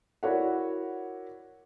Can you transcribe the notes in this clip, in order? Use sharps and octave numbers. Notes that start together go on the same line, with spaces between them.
E4 F#4 A#4 C#5 D5 F#5